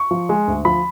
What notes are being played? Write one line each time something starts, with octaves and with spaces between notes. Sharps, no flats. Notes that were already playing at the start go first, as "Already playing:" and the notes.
Already playing: C#6
F3
G#3
D2
F3 B5